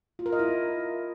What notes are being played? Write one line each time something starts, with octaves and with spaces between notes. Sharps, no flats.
F4
A#4
D#5
E4